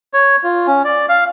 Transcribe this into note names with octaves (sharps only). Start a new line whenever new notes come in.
C#5
F4
C#4
D5
F5